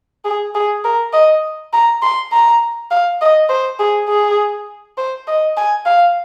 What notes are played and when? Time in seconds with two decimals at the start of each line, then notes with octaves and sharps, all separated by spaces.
0.25 G#4
0.55 G#4
0.84 A#4
1.13 D#5
1.73 A#5
2.02 C6
2.32 A#5
2.91 F5
3.21 D#5
3.49 C5
3.79 G#4
4.09 G#4
4.97 C5
5.27 D#5
5.57 G#5
5.86 F5